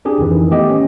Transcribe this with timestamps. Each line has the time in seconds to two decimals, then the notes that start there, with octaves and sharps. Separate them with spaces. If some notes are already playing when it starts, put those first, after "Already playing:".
0.05 C4 D4 G4 G#4
0.19 F2 D#3 E3
0.50 A3 B3 G4 D#5
0.70 C#4